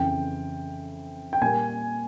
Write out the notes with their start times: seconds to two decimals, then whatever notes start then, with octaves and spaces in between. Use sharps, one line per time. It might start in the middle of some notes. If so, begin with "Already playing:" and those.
Already playing: F2 C#3 E3 G5
1.33 G5
1.42 A#2 G3 A#3 G#5